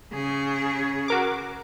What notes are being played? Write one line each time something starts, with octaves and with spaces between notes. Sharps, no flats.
C#3 G#4
F#4 A#4 D6